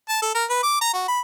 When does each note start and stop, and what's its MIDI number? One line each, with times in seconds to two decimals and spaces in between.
0.09 0.18 81
0.22 0.33 69
0.35 0.45 70
0.50 0.58 71
0.63 0.79 86
0.81 0.91 82
0.94 1.05 66
1.08 1.20 83